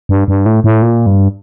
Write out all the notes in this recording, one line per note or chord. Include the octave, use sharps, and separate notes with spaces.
G2
G2
A2
A2
A#2
G2